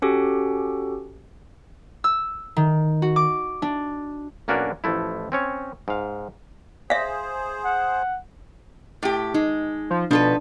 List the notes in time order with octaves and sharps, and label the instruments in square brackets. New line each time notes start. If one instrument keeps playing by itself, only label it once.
[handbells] C#4 F#4 G4 A4
[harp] E6
D#3
F#4
D6
D4
[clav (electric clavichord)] B1 A#3 C#4 D4 F#4 A#4
A1 F3 A3 E4
C4 C#4 C#5
G#2 F5
[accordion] G#4 C5 [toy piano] E5 F5
[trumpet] F#5
[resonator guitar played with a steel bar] A2 G4
[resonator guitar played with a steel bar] G#3 [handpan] D#4
[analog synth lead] F3
[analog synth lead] B2 [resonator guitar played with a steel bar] F3 A4 B4 [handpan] D4